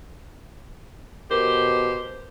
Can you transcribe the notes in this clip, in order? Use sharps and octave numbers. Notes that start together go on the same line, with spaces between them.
B2 G4 A#4 C5